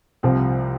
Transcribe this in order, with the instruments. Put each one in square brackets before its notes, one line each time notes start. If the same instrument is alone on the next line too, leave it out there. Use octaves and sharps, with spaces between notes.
[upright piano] C2 C3 F3 C4